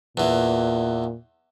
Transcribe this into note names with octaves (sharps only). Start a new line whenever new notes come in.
E2 A#2 E3